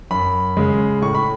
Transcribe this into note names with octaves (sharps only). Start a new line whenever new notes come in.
F#2 B5
C#3 G#3
A2 C#6
B5